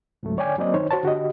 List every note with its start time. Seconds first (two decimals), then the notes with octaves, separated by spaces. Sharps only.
0.23 C#2 G#2 F#3 A3
0.37 D3 C#5 D5 G5 G#5 D6
0.58 F#3 A#3 C4 D5 D#5
0.74 D#3 D#4 C5 C#5
0.91 F#4 C5 C#5 A5
1.03 D3 F#4 G4 D#5